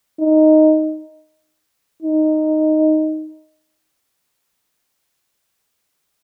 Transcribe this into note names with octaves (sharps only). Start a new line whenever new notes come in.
D#4
D#4